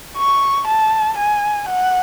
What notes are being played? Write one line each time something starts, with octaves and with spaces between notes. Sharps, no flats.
C#6
A5
G#5
F#5